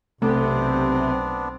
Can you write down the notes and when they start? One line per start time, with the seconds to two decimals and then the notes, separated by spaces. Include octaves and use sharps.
0.22 B1 C3 A3 B3 C4 D4